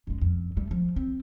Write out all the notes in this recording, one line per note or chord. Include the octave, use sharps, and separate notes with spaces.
F#1 G#3
F2
G3 A3
F3
C4